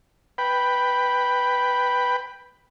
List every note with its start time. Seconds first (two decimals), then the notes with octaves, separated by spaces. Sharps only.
0.38 B4 G5 B5